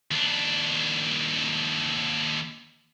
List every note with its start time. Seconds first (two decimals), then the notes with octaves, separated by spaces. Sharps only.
0.11 D#2 D4